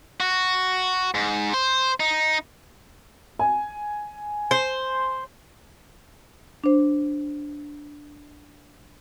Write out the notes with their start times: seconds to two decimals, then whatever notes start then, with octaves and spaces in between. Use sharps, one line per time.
0.20 F#4
1.15 G#2
1.54 C5
2.00 D#4
3.39 G#5
4.51 C5
6.64 D4 C5